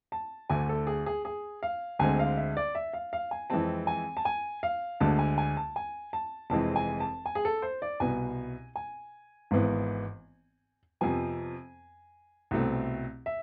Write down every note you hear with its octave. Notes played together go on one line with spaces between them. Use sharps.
A5
D2 D3 A3 G#5
A4
G#4
G#4
G#4
F5
D2 D3 G#3 C4 G#5
F5
E5
D5
E5
F5
F5
G#5
F2 E3 G#3 C4 A5
G#5
A5
G#5
F5
D2 D3 G#3 A5
G#5
G#5
A5
G#5
A5
F1 F2 E3 G#3 C4 A5
G#5
A5
G#5
G#4
A4
C5
D5
C2 B2 B3 G#5
G#5
G#1 G#2 E3 B3
F2 C3 F3 B3 G#5
C2 B2 A3 C4
E5